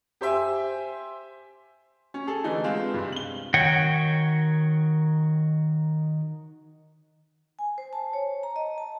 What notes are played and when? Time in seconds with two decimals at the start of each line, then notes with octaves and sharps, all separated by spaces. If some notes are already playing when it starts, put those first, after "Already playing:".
0.21 G4 C5 E5 G5 G#5
2.14 C#4
2.27 G#4 A4
2.44 D3 E3 A3 D#4 G#4
2.64 G#3 B3 C4 F4
2.94 G2 C3 G3
3.12 F#7 G7
3.54 D#3 F#4 C#5 F#5 G5
7.59 G#5
7.78 C5
7.93 A5
8.13 C#5
8.43 A#5
8.56 D#5
8.78 A5